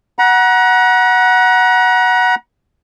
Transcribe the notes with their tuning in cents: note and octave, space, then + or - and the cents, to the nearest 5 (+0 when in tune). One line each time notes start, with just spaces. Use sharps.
F#5 +0 A#5 +40